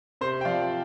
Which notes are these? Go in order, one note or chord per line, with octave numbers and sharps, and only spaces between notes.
C3 C5
G5
F3 D5 F5